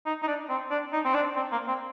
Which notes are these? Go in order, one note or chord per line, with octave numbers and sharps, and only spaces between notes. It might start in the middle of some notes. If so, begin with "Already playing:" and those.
D#4
D#4
D4
C4
D4
D#4
C4
D4
C4
A#3
C4